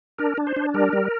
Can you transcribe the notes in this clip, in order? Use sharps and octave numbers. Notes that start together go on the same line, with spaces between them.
D4 A#4
D4
C5
D4
G3 A#4
G3